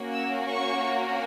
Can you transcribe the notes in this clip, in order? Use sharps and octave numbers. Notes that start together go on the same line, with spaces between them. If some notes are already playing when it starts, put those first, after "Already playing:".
Already playing: A#3 C#4 F#4
E6
C#6